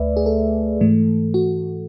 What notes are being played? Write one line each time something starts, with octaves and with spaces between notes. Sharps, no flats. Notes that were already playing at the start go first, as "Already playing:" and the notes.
Already playing: D2 A3 B4 D5 E5
G#4
A4
G#2 E3 A3
F#4